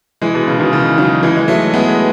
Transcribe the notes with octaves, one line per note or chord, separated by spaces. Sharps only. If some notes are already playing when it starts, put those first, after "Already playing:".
E3 G#3
B2
C#3
B2 D#3
C#3 E3
D#3 F#3
E3 G#3
G#3
F#3 A3
G#3 B3